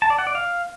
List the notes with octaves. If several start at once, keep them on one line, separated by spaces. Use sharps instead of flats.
A5
D5
F#5
D5
F5